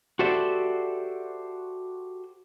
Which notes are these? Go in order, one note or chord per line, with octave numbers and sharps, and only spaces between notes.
F#4 G4 A4 C5 D5 E5